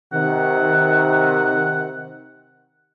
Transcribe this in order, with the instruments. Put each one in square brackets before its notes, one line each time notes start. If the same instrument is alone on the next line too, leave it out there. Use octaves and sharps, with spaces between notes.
[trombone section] C3 D#3 [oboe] F#5